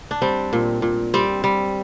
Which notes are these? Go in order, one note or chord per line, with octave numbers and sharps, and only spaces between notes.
D4
G3 C4
A#2
A#2
G3 C4
G3